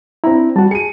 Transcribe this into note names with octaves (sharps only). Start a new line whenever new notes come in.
C4 D4 E4 A#5
G3 F#4 A5
G#4 C#7 D#7